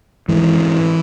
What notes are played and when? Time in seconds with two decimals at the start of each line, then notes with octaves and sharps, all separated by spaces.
0.28 G#2 E3